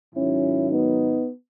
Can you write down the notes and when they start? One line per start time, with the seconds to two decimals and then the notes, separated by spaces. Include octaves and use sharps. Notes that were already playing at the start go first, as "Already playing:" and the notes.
0.14 G#2 D#3 F#3 C#4 E4
0.69 B3 D#4